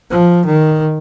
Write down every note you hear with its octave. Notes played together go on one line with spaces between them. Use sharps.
F3
D#3